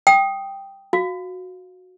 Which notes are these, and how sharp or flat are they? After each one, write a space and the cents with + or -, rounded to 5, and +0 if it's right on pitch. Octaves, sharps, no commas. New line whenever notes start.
G5 +0 D#6 +0
F#4 -10 F5 +0